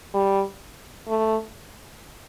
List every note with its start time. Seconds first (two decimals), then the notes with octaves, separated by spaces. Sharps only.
0.14 G3
1.08 A3